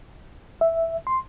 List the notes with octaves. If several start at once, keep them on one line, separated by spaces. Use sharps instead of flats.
E5
C6